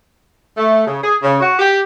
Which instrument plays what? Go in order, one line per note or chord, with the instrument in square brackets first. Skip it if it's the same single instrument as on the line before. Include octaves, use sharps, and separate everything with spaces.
[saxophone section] A3
C#3
G#4
C#3
F#4
G4